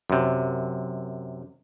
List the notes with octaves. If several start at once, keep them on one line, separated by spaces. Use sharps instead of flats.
F#2 C3